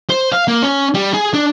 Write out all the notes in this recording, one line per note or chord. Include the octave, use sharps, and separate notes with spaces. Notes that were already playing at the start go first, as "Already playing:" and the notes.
C5
F5
A#3
C#4
G3
G#4
D4